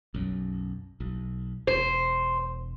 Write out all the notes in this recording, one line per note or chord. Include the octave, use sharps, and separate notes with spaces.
B1 F#2
B1
E1 C5